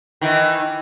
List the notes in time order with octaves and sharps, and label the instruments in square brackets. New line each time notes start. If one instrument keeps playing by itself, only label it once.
[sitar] D#3 E3